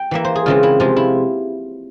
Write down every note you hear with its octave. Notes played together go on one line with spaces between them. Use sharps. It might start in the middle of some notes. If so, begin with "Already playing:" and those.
Already playing: G5
E3 A#3 E5
C5
G#4
C#3 E3 G#3 C4 F4
E4
C3 F3 G#3 F4
E4